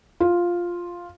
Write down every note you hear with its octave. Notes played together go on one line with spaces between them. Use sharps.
F4